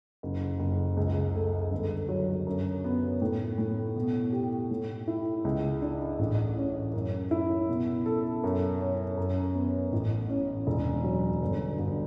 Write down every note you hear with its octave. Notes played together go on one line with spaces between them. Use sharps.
F#1
F#1
C#2
A3
G1
F#3
F#2
B3
A2
A2
B2
G4
A2
E4
C#2
D4
A1
C#4
F#2
E4
B2
A4
F#2
C#4
F#2
B3
A1
C#4
E1
F#3
G1
G1